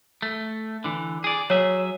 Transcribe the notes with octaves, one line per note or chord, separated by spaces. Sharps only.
A3
D3 E3
G#4 D5
F#3 G#4 C#5 E5